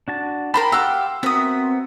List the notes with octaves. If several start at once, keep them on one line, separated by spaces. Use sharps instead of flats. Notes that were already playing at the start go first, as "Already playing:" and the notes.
D4 F#4 A5
A#4 C5 G5 A5 B5
G4 F5 F#5 C6 E6
B3 C4 F#4 A#4 E5 D#6